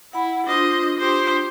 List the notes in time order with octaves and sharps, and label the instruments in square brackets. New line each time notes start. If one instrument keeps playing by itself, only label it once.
[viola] E4 [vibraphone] F#5 B5
[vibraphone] D4 F4 D#6 [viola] C5 D#5
[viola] G4 C5